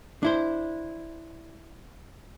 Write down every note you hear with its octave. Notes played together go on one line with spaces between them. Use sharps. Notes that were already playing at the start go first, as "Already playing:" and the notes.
D4 E4 C5